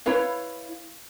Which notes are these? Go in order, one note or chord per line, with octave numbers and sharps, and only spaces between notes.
E4 B4 C#5 F5